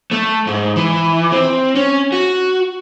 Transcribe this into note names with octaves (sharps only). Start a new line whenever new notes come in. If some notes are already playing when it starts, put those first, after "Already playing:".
A3
G#2
E3
C4
C#4
F#4